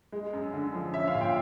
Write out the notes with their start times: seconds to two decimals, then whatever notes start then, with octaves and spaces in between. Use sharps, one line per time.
0.12 G#3
0.33 F#2
0.54 D3
0.73 F3
0.93 C#4 E5
1.07 F5
1.15 A#2
1.21 G5